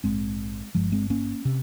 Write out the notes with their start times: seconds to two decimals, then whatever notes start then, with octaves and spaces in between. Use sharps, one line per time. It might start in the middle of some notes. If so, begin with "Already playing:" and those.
0.04 A#1 G#2 G#3 C4
0.75 G1 G2 F3 G#3
0.92 G#3 C4
1.10 A#3 C#4
1.45 C3